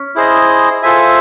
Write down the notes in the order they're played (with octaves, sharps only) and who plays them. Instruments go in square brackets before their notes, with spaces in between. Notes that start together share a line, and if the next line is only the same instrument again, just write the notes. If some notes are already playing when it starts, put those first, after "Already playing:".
Already playing: [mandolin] C#4
[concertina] E4 G#4 C5 D#5
F4 A4 C5 E5 G#5